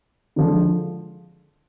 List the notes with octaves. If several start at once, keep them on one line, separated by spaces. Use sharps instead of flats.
D3 F3 G#3